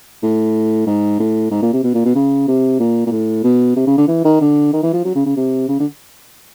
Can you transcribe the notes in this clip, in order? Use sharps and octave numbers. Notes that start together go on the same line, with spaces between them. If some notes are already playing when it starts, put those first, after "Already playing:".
A2
G#2
A2
G#2
A#2
C3
B2
A#2
B2
C#3
C3
A#2
A#2
A2
B2
C3
C#3
D3
E3
D#3
D3
D#3
E3
F3
F#3
C#3
C#3
C3
C#3
D3